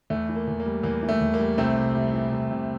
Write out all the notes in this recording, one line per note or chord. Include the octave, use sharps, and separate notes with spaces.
E2 A3
E3
A#3
E2
A#3
G3
E2 A#3
E3
A3
E2
A#3
G3
C2 A3 C4
C3
G3
E3
C2
C3